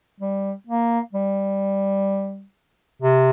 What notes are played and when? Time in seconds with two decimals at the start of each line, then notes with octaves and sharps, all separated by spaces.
0.20 G3
0.67 A#3
1.13 G3
3.02 C3